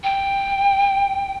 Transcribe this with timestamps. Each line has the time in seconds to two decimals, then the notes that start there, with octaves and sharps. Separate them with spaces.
0.04 G5